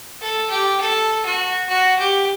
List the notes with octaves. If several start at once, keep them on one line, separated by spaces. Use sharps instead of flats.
A4
G4
A4
F#4
F#4
G4